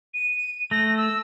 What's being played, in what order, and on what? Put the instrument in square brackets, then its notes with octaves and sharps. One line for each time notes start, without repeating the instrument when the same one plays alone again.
[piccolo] D#7
[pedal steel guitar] A3 [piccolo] A#6
[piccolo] E6